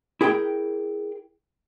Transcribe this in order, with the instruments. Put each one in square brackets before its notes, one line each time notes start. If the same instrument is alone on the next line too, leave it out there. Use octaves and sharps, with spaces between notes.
[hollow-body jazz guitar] E4 G#4 A#4 G5